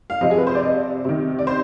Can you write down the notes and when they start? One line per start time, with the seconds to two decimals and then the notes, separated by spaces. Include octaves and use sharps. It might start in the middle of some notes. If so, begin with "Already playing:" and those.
0.10 F5
0.21 C3 F3 D#5
0.31 G#4
0.38 B4
0.47 C5
0.55 D5
0.63 D#5
1.05 C3 D#3
1.39 D5
1.47 C5